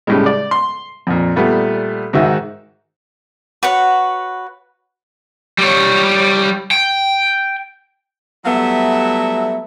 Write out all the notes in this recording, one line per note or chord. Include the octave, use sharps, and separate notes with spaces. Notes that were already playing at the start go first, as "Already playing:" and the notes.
A2 C#3 G3 G#3
D5
C6
F2 A#2
A#2 G3 A3 B3
G#2 D#3 F#4 E5
F#4 B4 C#5 F#5
G3 C#5
G5
F#3 G3 A3 B3 E4 E5